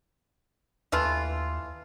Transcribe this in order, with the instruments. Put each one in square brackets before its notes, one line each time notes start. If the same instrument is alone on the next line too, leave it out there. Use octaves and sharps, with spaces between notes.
[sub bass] D#2 [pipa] E3 A3 F4